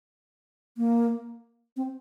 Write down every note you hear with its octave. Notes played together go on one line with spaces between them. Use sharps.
A#3
C4